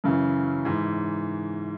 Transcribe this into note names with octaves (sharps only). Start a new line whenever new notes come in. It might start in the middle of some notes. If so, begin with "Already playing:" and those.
F#2 C#3 E3
G#2 E3